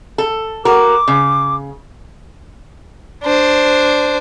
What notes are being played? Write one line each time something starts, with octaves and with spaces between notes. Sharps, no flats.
A4
F#4 A#4 D6
C#3
D4 C5